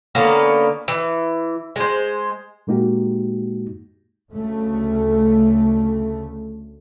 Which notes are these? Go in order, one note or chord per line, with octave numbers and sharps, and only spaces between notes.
D3 A#3 B3 C#4
E3
G#3 C5
A#2 G#3 A#3 D#4 F#4 G4
D2 C#3 A3